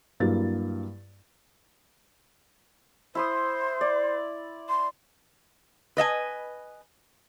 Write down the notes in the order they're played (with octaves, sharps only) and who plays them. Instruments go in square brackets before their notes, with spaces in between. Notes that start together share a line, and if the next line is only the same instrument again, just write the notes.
[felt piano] G2 F#3 A#3 E4 A6
[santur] E4 C6 D#6 [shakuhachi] C5
[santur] D5
[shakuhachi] C6
[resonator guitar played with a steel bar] B4 D#5 E5 G#5